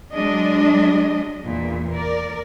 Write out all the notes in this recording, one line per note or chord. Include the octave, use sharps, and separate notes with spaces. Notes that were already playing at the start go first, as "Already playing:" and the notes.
F#3 G#3 D4 D#5
E2 A#2
A#4 D5